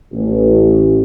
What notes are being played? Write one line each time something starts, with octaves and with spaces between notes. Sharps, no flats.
A1